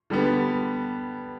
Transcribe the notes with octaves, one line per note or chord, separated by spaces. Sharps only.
D3 G3 B3